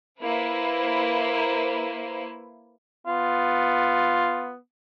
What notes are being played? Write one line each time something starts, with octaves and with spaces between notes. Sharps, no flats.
A#3 E4 B4 C5
B3 F4